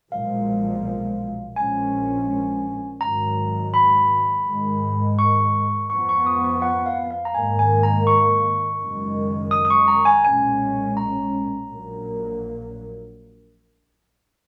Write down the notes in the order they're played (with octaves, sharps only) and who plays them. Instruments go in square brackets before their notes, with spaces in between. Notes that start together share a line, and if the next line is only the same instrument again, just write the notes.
[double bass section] B1 A#2 F3 G#3 [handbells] F5
[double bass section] A#1 A#2 F3 G#3 C#4 [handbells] G#5
[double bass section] G#1 G#2 D#3 F#3 [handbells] A#5
[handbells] B5
[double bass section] G#2 D#3 G#3
[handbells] C#6
[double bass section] F2 F3 B3 [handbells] C#6
[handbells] C#6
D#6
C#6
F#5
F5
F5
A#5
[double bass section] G#2 D#3 A#3 [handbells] G#5
[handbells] G#5
A#5
C#6
[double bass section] F#1 F#2 D#3 G#3
[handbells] D#6
D#6
C#6
A#5
G#5
[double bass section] B1 A#2 G#3 C#4 [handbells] G#5
[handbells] A#5
[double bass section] A#1 A#2 F#3 A#3